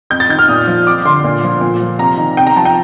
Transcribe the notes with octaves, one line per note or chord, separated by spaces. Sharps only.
F2 G6
A6
D#3 G6
F6
A#2 D#6
F3
F2 D6
D3 C6
A#2
F3
A#2
F3
C3 A#5
D#3
C3 G5
A#5
F3 A5
G5